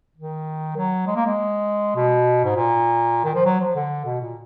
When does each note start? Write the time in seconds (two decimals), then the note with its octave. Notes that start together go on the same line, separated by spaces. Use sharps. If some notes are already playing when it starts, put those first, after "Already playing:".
0.17 D#3
0.76 F#3
1.07 G#3
1.16 A#3
1.26 G#3
1.96 B2
2.44 G#2
2.56 A#2
3.24 D#3
3.35 F3
3.45 F#3
3.60 F3
3.75 D3
4.05 B2
4.21 A#2